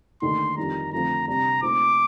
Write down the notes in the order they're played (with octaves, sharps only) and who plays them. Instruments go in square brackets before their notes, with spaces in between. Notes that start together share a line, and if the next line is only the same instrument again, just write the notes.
[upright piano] D#2 D3 A3 D#4 [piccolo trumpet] C6
[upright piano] F2 D#3 G3 [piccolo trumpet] A#5
[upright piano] F2 D3 F3 A3 C4 [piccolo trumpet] A#5
[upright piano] C3 G3 D4 [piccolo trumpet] A#5
[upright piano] A#2 A3 C4 D#4 [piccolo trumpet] D6